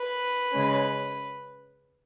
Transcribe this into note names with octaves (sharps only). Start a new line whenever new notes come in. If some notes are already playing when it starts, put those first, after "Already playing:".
Already playing: B4
C#3 G#3 C#4